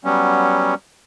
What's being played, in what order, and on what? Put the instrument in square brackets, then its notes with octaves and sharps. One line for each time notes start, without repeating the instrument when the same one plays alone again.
[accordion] F#3 G3 B3 C#4